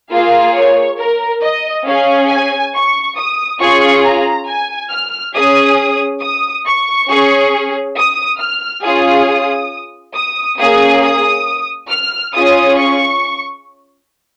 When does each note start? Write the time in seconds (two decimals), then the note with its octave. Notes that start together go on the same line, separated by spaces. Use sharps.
0.11 A#3 F4 G#4 F5
0.55 C#5
0.98 A#4
1.42 D#5
1.86 C#4 G#4 F5
2.30 G#5
2.73 C#6
3.17 D#6
3.60 C#4 F4 G#4 C#6
4.04 A#5
4.48 G#5
4.91 F6
5.35 C#4 G#4 D#6
6.22 D#6
6.66 C#6
7.10 C#4 G#4
7.96 D#6
8.40 F6
8.84 C#4 F4 G#4 D#6
10.15 D#6
10.59 A#3 C#4 G#4 D#6
11.03 D#6
11.90 F6
12.33 C#4 F4 G#4 D#6
12.77 C#6